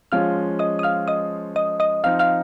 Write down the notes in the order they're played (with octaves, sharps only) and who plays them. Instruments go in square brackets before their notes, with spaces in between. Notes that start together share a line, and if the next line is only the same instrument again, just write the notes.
[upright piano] F3 G#3 C#4 F4 [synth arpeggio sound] F5 F6
[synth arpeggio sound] D#5 D#6
D#6
F5 F6
D#5 D#6
D#5 D#6
D#5 D#6
[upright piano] F3 C4 D#4 [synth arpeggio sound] F5 F6
[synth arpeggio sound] F5 F6